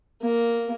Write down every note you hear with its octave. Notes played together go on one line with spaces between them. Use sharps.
A#3